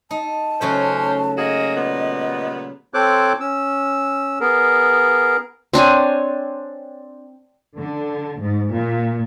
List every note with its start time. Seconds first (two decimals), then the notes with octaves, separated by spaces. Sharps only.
0.11 D#4 A5
0.61 C#3 F#3 A3 C#4 C5
1.38 A#3 F#4 G#4 D#5
1.76 A#2 G3 B3
2.94 C4 A4 C5 C#5 D6 F#6
3.40 C#4 E6
4.40 B3 G#4 A#4
5.73 C4 D4 C#5 G#5
7.78 D3
8.40 G#2
8.73 A#2